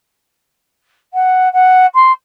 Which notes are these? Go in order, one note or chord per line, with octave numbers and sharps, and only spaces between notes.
F#5
F#5
C6